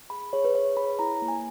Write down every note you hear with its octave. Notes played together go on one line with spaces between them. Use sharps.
G#4 B5
G#4 C#5
B4
G#4 C#5
G#4 B5
E4 A#5
A#3
G#5